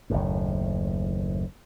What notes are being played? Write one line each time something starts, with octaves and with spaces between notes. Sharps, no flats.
F#1 D#2 A2